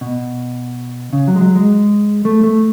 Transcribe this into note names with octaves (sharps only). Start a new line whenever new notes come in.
B2
C#3
F#3
G#3
F#3
G#3
A3
A3